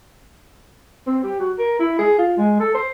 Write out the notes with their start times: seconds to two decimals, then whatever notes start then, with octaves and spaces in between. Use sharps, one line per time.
1.07 C4
1.24 G4
1.39 F#4
1.58 A#4
1.79 E4
1.99 G#4
2.18 F4
2.37 G#3
2.60 A4
2.75 C5